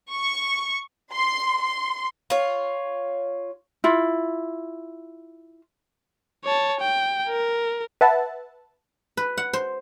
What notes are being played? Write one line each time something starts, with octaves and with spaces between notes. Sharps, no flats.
C#6
C6
C6
F4 C#5
E4 F4
C#5 A5
G5
A#4
B4 E5 F#5 A5
B4
F#5
C5